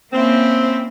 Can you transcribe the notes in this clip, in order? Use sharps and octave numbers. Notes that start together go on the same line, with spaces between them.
A#3 C4 C#4 E4